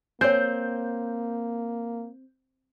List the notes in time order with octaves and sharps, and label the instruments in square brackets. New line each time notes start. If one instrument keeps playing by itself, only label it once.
[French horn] A#3 [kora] C4 [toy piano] C#5 G#5 [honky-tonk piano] G6